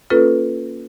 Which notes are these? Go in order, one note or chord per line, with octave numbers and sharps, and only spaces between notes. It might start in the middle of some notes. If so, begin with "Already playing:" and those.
A#3 C#4 F4 A4 B4